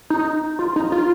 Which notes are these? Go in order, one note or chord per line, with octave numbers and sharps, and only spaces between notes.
D#4
F4
D#4
F4